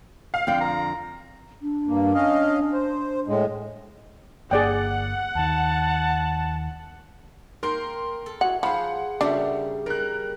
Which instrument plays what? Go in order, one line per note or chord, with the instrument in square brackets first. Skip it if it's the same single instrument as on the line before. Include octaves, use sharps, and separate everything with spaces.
[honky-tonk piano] F5
[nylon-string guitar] F2 D3 D5 [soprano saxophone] G5
[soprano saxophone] A#5
[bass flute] D4
[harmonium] G2 A#3
C#4 D#5 F5
C5
A2 G#3
[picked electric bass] G1 A#3 [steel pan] G#4 D5 G5 [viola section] F#5
[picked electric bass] D#2 D#3 [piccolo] A5
[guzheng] A#3 G5 [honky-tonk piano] A#4 C6
[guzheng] A4
[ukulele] E4 F#4 G#4 [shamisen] F#5
[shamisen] F3 [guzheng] G#4 C5 [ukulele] F5 B5 [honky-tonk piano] F#5
[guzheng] C#3 G3 A#3 [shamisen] D4 [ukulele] F#4 A4 E5
[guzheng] G3 [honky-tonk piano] A#4 F#6